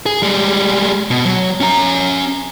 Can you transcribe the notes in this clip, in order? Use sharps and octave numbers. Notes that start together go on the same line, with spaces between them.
G#4
G3 G#3
B2
F#3
C#4 A#5